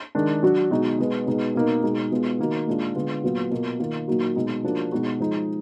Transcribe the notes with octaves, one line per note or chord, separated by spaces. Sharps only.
D#3 G#3 D4
F#3 D4 F#4
B2 G#3 D#4 F#4
B2 G#3 B3
B2 G#3 B3 D#4
B2 A#3 D#4
B2 G#3 D#4 F#4
B2 G#3 B3 F4
D#3 A#3 D#4 F#4
A#2 G#3 D4 F4
D3 G#3 B3 F4
A#2 F#3 B3 F4
B2 A#3 F4
D#3 A#3 F4
A#2 F#3 A#3 D#4 F#4
B2 G#3 D#4
F3 A#3 D4 F#4
B2 G#3 D#4 F#4
F3 G#3 D#4